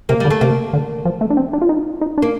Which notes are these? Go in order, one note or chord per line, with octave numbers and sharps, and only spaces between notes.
C3 A#3
G3
D3
A3
C3 A#3
D3
F3
A3
D4
C4
D4
F4
D#4
D#4
D4
A#3